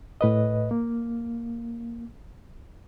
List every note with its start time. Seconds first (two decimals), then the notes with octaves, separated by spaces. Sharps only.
0.21 A2 B4 D#5
0.71 A#3